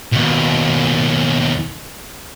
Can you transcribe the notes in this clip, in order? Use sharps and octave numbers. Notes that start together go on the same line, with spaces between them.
D#2 B2